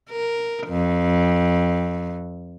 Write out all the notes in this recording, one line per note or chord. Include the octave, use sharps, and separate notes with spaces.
A#4
F2